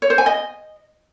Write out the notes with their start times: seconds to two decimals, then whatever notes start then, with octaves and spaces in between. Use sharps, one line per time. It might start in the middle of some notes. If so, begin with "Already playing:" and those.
0.02 C#5
0.10 C5
0.18 G#5
0.26 D#5